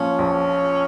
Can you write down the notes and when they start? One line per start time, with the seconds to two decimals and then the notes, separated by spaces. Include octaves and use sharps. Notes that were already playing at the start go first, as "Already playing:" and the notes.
Already playing: A#1 A#2 F3 C#4
0.19 A#1